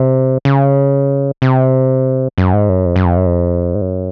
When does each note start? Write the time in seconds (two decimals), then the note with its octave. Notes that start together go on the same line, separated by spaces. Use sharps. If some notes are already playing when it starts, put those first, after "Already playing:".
Already playing: C3
0.45 C#3
1.42 C3
2.38 F#2
2.53 G#2
2.69 F#2
2.86 F2
2.96 F#2
3.05 F2
3.17 F#2
3.26 F2
3.75 G#2
3.81 F#2